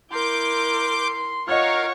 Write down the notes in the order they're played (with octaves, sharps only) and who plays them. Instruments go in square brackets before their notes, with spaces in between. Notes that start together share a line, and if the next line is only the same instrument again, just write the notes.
[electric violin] E4 A#4 [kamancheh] C6 [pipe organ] D6 G6
[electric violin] F4 C#5 [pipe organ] A#4 F5 [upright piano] D#5 F6 [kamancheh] F#5 C#6